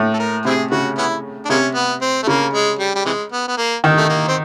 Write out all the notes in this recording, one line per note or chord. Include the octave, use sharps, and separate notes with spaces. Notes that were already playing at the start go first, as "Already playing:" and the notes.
Already playing: A2
A4
A#4
C3 C4 E4 G#4
C#3 F#4
B3 C#4 E4
D4
C3 G#3 A#3 C#4
B3
C4
A3
C#3 A#3
G#3
G3
G3
C3 E3 G#3
B3
B3
A#3
D#3
A3
A#3
C4